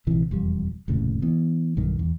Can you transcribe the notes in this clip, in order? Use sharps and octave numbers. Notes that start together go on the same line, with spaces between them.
A#1 C3 E3
E1 F2 G3
F1 D#2 A2 C#3
E3 B3
B1 G2 D#3
E2